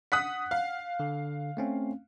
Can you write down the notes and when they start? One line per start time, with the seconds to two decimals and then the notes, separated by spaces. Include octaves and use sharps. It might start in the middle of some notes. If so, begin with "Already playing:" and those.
0.12 F#5 D#6 F#6 B6
0.51 F5
1.00 D3
1.57 A3 C4 C#4